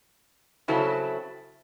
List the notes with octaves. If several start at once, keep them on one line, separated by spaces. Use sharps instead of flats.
C#3 F#3 C4 E4 A4